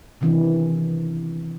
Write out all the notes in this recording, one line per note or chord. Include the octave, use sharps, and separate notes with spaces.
C3 D#3 E3 C4 D4